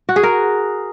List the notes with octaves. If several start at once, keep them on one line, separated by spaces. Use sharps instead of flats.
F#4
G#4
A#4